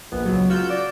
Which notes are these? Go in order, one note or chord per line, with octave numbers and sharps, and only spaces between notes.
A#1 B3
C#2 F#3
F4 F#4 E6 G6
D5